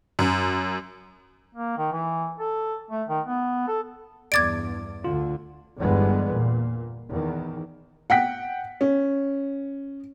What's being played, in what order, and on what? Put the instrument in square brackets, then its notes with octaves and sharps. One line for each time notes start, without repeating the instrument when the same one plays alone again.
[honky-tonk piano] F#2
[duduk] A#3
D#3
E3
A4
A3
D#3
B3
A4
[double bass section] E2 G2 [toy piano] D5 D6 [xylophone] G#6 A6 D7
[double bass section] D2 D3 [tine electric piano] F4
[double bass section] G1 E2 G2 G3 G#3 B3
A#2
E2 D#3
[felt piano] F#5 G5 B6
C#4